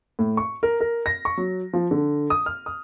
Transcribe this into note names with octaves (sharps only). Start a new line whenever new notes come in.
A2
C#6
A#4
A#4
A#6
C#6
F#3
F3
D3
D#6
F6
D#6